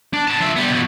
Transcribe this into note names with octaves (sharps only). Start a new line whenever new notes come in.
D4
B3 A5
F3 E5
G3 B3
B2 F3